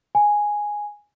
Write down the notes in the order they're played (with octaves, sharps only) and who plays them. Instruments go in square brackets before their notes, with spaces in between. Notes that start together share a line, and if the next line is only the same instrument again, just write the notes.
[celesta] G#5